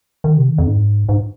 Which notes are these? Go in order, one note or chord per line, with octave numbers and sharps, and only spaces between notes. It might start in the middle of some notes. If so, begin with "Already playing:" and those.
D#3
C3
D#3
F2
G#2
G#2